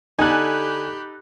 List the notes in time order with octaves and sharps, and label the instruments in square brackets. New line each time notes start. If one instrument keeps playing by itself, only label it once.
[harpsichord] D3 [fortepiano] D#4 A4 [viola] G4 B5 [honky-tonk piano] G#5 F#6